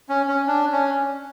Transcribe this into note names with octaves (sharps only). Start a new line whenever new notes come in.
C#4
C#4
D4
C#4